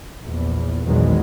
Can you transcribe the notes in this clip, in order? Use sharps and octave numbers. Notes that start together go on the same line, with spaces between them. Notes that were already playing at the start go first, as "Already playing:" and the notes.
A#1 E2
A#1 E2 A#2 D#3 F#3 G#3